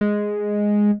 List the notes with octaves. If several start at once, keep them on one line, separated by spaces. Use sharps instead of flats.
G#3